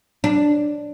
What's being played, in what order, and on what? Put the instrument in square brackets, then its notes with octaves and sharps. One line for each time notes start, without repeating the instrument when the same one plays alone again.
[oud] D4